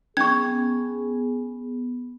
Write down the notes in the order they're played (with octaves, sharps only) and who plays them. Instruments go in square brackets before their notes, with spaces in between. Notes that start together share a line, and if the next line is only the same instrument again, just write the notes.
[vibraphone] B3 [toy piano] C#4 C#6 [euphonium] G#4 [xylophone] G#6